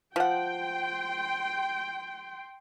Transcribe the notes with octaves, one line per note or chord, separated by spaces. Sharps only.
F3 F#5 G5 C6